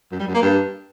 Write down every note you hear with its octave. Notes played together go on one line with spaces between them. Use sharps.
F#2
G3
F#2
A#3
G2